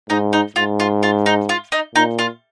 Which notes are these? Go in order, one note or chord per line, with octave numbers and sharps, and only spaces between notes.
G#2 D#4
D#4
G#2 F4
F4
F4
D#4
F4
D#4
A#2 D#4
F4